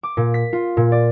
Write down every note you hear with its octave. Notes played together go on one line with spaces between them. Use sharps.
D6
A#2
B6
F4
A#2
D5